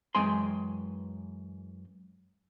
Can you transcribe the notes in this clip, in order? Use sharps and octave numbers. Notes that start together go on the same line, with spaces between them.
F#2 E3 G#3 G5 G#5 C6